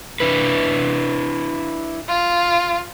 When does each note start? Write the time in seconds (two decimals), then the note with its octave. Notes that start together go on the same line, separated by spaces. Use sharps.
0.20 D4 E4 B4
2.08 F4